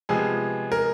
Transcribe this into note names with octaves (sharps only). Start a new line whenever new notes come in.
C3 F3 G#3 B3 G#4
A#4